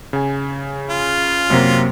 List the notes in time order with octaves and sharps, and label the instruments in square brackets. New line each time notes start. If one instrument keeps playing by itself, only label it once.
[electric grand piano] C#3 G#5
[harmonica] F4
[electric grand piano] F#2 F#3 A#3 [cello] C3